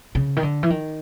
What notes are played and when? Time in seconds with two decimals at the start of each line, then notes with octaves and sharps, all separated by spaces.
0.15 C#3
0.36 D#3
0.43 D3
0.63 E3
0.70 D#3